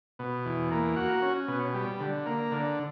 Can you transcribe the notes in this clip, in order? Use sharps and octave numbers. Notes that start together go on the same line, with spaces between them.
B2
E2
A#3
F#4
C#4
B2
G3
D3
A#3
D3